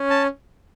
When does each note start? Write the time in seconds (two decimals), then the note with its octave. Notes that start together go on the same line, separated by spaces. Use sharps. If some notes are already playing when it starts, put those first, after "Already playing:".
Already playing: C#4
0.10 A5